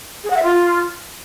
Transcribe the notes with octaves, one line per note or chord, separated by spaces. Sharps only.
G#4
F#5
E5
F4